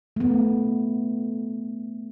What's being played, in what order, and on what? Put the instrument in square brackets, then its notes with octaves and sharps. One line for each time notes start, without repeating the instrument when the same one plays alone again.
[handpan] A3 B3